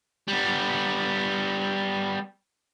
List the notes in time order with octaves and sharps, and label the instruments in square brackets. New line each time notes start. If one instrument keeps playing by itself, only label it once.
[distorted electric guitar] G3 B3